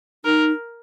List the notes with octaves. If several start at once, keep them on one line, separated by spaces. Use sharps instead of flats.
D#4 A#4